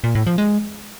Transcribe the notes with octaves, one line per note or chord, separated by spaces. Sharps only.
A#2
A2
F3
G#3